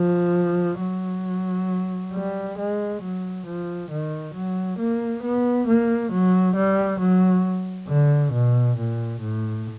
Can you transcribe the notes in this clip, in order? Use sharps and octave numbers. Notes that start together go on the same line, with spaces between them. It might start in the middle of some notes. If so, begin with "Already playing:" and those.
Already playing: F3
F#3
G3
G#3
F#3
F3
D#3
F#3
A#3
B3
A#3
F#3
G3
F#3
D3
B2
A#2
A2